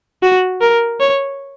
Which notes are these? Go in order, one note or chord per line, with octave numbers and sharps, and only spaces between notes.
F#4
A#4
C#5